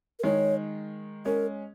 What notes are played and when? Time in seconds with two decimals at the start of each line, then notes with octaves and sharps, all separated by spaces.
0.19 A#4
0.23 D#3 G#3 C#5
1.25 G#3 C#4 A#4